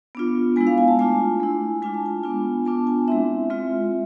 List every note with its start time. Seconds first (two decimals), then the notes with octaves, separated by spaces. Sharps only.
0.15 B3 D4 F4
0.56 G#3 B3 E4 G#5
0.67 F5
0.78 G#5
0.88 A5
0.99 A3 D4 F4 G#5
1.40 A3 E4
1.82 G#3 D4 F4 G#5
1.94 A5
2.06 G#5
2.24 B3 D4 F4
2.65 B3 D4 F4 A5
2.87 G#5
3.08 G#3 C4 E4 E5
3.50 G#3 C4 F4